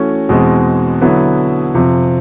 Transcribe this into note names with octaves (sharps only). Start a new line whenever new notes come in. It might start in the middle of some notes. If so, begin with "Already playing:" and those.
Already playing: E3 A3 C#4 F#4
E2 B2 G#3 C4
D3 F#3 B3 E4
F2 C3 F3